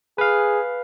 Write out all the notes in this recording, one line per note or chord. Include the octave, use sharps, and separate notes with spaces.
G#4 B4 F5